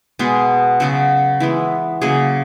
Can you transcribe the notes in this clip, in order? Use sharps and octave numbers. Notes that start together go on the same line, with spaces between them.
B2 G#3 B3 G#4
C#3 F#3 B3 F#4
E3 G#3 B3
C#3 F#3 A#3 G#4